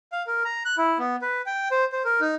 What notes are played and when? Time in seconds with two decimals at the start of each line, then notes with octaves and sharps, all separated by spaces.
0.12 F5
0.27 A#4
0.45 A#5
0.65 F#6
0.78 E4
0.99 B3
1.22 B4
1.46 G5
1.71 C5
1.92 C5
2.05 A#4
2.20 D#4